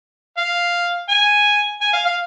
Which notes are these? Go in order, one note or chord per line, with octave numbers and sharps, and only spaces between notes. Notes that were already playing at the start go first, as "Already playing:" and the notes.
F5
G#5
G#5
F5
F5